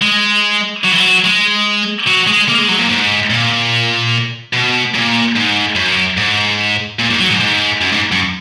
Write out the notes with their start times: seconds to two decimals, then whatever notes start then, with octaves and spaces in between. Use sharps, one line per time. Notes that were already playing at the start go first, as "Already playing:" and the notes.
0.02 G#3
0.84 F#3
0.92 E3
1.00 F#3
1.24 G#3
2.07 F#3
2.27 G#3
2.48 A#3
2.58 G#3
2.68 F#3
2.78 A#2
2.89 G#2
3.30 A#2
4.53 B2
4.94 A#2
5.36 G#2
5.76 F#2
6.17 G#2
6.99 A#2
7.10 G#2
7.20 F#3
7.30 G#2
7.41 G#2
7.81 F#2
7.92 G#2
8.12 F#2